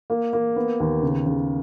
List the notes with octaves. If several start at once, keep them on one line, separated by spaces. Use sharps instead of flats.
A#3
A#3
B3
D#2
C#3
C#3